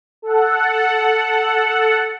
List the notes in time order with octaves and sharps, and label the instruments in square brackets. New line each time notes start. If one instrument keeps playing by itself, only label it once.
[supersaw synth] A4 F#5